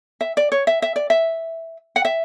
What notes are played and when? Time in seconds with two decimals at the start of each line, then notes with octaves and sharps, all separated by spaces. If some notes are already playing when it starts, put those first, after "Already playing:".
0.21 E5
0.37 D5
0.52 C#5
0.67 E5
0.82 E5
0.96 D5
1.10 E5
1.96 F#5
2.05 E5